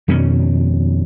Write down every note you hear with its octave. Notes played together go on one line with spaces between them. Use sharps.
F2 B2 D#3 C#4